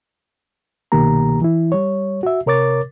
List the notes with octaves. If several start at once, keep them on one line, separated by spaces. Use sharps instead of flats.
C2 B2 D#3 A#3 G4 A#5
E3 E4
G3 C#5
F#4 E5
C3 A#4 C#5 D6 A6